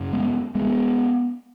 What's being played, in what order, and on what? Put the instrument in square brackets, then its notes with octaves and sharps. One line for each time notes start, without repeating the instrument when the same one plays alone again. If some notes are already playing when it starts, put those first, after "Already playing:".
Already playing: [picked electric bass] F#2 C#3
G#3 B3
G#3 B3